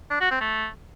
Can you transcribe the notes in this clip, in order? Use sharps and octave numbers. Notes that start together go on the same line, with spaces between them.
D4
F#4
C4
A3